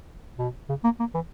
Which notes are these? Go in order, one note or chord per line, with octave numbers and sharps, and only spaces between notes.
B2
C#3
A#3
A#3
E3